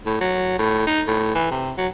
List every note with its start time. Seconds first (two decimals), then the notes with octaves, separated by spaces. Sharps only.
0.06 A2
0.21 F#3
0.59 A2
0.87 D#4
1.07 A2
1.35 E3
1.51 C3
1.78 F#3